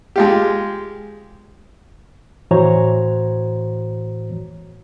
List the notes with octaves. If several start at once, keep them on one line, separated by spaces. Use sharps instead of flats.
G#3 F4 G4
A2 E3 F#4 C5 C#5 A#5